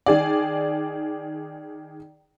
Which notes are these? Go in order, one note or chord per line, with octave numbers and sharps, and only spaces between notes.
D#3 G#4 D5